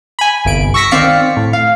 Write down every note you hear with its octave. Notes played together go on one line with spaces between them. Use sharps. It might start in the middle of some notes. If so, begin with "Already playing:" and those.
G#5 B5
G1 C2 D7
C#6 E6 A#6 B6 C#7
D#3 C4 D5 F5 B6 C#7
A2
F5